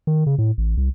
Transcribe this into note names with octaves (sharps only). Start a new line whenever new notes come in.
D#3
C#3
A2
A1
C2